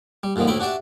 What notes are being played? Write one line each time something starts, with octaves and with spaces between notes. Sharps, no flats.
G3
G2 A#2 D3 D#3 F3
D2 A2 A3 E4 G5 B5
D4 F#4 G4 D5 E5